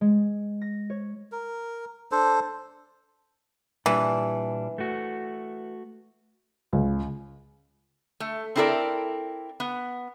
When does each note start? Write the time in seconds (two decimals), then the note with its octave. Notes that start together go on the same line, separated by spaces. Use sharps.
0.01 G#3
0.61 A#6
0.90 C#5
1.32 A#4
2.12 D4 A4 C5
3.86 A#2 E3 G3 D4
4.78 A3 F#4
6.73 C#2
8.20 A3
8.56 C4 D4 E4 A4 A#4 D5
9.60 B3